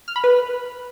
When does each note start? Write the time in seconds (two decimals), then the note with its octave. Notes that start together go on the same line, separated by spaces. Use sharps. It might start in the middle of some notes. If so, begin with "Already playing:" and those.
0.08 F6
0.16 B5
0.24 B4